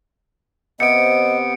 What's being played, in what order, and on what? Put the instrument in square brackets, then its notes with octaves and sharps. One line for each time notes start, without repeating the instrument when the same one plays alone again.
[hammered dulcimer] C3 [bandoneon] B3 [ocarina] D#5 [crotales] C#7 D7